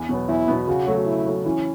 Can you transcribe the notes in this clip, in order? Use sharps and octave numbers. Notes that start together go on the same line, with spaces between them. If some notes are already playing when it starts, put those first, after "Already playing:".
Already playing: E2
B2 F#3 B3
E2 E4
B2 F#3 B3
C#3 F#4
F#3 A3
C#3 E4
F#3 A3
E3 C#4